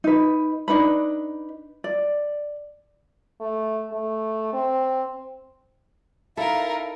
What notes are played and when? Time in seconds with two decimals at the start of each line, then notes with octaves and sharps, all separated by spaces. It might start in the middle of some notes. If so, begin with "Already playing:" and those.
0.04 D#4 B4
0.68 D4 D#4 B4 B5
1.84 D5
3.40 A3
3.92 A3
4.53 C4
6.37 D#4 E4 A4 A#4 F5